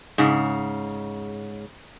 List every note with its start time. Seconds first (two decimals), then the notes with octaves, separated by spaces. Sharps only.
0.18 G#2 C#3